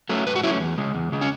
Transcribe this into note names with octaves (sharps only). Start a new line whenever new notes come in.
F#3 A3 C#4
G#2 B4
F#4
F#3 A3 C#4 E4
E2
C#3 G#3
E2
C#3 G#3
C#4